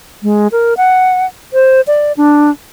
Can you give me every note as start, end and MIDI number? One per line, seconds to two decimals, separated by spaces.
0.23 0.48 56
0.52 0.74 70
0.77 1.26 78
1.53 1.81 72
1.87 2.12 74
2.17 2.51 62